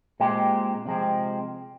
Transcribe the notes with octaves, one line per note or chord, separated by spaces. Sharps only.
A#2 G#3 C4 G4
C3 F3 G#3 C4